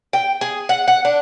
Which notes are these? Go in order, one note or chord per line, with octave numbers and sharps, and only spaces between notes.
G5
G#4
F#5
F#5
D4